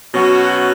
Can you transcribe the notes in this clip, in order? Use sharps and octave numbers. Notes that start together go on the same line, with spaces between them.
B2 F#3 C#4 F#4